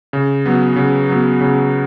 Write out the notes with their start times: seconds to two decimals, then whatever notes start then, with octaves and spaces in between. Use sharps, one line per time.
0.13 C#3
0.46 F#3 B3
0.76 C#3
1.09 F#3 B3
1.41 C#3